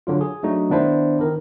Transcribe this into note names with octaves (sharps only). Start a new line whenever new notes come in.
D3 F#3 F4
G#4
F#3 A3 D4 D#4 F#4
D#3 B3 D4 E4 C5
D#3 A#4